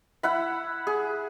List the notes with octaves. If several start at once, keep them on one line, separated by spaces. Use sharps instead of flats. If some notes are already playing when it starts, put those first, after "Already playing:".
E4 F#5 B5
G#4